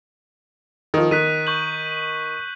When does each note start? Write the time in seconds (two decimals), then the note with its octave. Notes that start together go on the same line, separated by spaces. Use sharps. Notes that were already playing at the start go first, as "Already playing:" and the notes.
0.94 D#3 F3
1.11 D#3 F#6 B6 D#7
1.47 C#6 G6 F#7